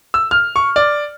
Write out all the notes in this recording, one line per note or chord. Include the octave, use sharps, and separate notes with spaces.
E6
F6
C#6
D5